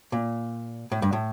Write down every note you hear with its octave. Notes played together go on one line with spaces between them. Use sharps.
A#2
A2
G2
A2